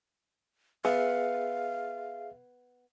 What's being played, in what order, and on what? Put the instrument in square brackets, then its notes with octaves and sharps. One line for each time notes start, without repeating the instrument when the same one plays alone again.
[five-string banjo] B3 [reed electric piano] G#4 E5 [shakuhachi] F5